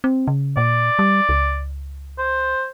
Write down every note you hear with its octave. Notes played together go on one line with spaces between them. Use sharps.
C4
C#3
A#2 D5
G3
C#2
C5